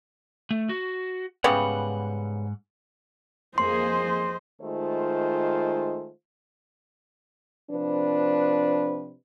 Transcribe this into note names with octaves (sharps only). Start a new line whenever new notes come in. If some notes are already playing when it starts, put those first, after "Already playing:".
A3
F#4
G#2 C#3 G3 B3 F#5
F2 A#3 G#4 C5 D#5 C6
D#3 G#3 A3 F4 C5
C3 F3 D4 B4